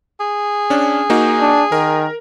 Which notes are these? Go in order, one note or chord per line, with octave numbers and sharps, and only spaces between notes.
G#4
C#4 D4
A#3 D#4 F#4
D4
D#3 A#4